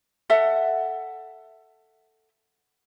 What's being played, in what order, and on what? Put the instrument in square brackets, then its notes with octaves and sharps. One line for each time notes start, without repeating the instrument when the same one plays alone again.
[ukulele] A4 E5 F#5